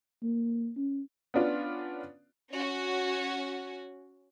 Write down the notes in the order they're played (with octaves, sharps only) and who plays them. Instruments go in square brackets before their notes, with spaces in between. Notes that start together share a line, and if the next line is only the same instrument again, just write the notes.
[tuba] A#3
C#4
[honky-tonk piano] B3 C#4 D4 F4
[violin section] C#4 F#4